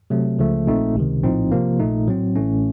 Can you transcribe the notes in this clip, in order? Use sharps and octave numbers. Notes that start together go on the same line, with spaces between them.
C3 F#3 A3
C#2 C#3 F3 A3
A#1 A#2 A3 C4 D#4
C#2 C3 D#3
A#1 A2 F3 C4 D#4
C3 F3 A#3
A#1 A#2 A3 D#4
A2 F#3 C4
A1 A2 A3 C#4